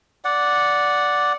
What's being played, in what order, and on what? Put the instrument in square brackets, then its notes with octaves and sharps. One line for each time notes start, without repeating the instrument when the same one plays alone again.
[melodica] D5 F#5